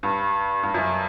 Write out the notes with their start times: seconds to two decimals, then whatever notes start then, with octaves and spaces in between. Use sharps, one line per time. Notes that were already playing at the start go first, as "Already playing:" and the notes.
0.03 G2
0.63 G2
0.74 F#2